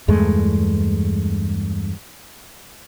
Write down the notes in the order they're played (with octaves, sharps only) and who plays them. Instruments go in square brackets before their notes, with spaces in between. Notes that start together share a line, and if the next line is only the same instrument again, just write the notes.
[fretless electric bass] E2 G2 G#3 A3